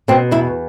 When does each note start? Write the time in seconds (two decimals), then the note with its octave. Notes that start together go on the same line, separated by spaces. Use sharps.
0.08 B2 C4
0.31 E2 E4